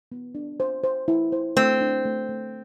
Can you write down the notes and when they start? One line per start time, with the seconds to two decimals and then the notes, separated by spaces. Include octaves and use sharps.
0.12 B3
0.35 D4
0.60 C5
0.84 C5
1.08 E4
1.32 C5
1.57 A3 C4
1.81 D4
2.05 A3
2.29 A3